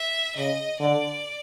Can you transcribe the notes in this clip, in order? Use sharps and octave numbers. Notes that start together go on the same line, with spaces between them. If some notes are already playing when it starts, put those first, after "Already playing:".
Already playing: E5
C#3 D#5
D3 D5